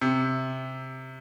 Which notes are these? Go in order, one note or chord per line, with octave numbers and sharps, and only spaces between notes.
C3